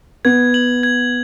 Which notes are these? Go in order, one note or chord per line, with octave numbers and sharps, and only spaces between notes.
B3 G#6
F#7
G#6